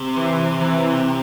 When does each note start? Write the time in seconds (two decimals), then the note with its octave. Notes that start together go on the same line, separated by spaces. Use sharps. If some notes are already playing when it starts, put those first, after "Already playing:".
Already playing: C3
0.15 E3
0.59 E3